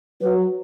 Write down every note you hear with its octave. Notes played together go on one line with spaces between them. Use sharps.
F#3 B4